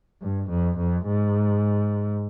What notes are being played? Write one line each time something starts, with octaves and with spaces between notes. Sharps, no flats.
G2
F2
F2
G#2